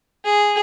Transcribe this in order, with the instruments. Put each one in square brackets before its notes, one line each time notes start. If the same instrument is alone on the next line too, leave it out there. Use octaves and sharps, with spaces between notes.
[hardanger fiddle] G#4